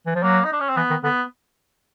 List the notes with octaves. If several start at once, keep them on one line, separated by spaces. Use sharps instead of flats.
E3
F3
F#3 A#3
D#4
D4
C#4
C4
E3 B3
D#3
D3 B3